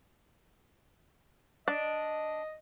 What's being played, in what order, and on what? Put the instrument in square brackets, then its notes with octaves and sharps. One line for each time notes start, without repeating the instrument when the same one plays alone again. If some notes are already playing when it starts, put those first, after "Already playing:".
[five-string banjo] D4 [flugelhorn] D#5